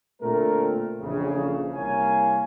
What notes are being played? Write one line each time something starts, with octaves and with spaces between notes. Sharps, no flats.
A#2 D3 A3 C4 A#4
A#1 F2 C#3 E3
C2 A#3 C#5 F5 G#5